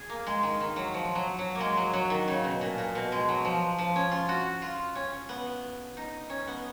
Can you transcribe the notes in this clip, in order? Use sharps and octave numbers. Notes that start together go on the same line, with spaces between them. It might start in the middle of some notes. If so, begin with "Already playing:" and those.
Already playing: G#4
A#3
G#3
D#3
D#3
F#3
F3
F#3
F#3
A#3
G#3
F#3
F#3
D#3
C#3
B2
A#2
A#2
B2
G#3
F#3
F3
F3
C#4
F4
F#4
F4
C#4
B3
D#4
C#4
B3